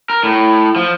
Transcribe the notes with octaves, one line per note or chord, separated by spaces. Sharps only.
A#4
A2
F3